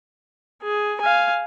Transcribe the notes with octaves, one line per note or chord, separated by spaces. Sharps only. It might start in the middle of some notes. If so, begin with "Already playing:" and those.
G#4
F5 G#5